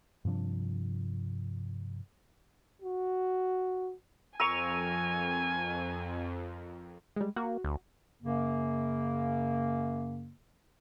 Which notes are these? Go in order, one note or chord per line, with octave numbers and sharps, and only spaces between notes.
G2 C3 F3 D4
F#4
F2 A#4 G#5 C#6 E6 D#7 F7
G3 G#3
A#3 F#4
D2
F#2 C#3 A#3